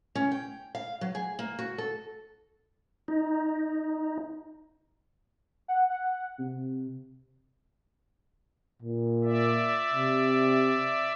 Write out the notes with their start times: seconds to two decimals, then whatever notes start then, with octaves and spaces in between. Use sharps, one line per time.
0.15 C#4
0.32 G5
0.75 F5
1.01 F#3
1.15 G#4
1.39 A#3
1.59 F#4
1.78 A4
3.08 D#4
5.68 F#5
5.90 F#5
6.38 C3
8.82 A#2
9.24 D5 E5
9.93 C3